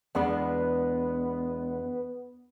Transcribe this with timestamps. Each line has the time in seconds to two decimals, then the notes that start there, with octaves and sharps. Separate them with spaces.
0.15 E2 G#3 B3 D4